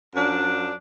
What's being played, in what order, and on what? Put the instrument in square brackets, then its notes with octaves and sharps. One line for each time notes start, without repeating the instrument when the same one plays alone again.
[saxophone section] F#2 F3 D4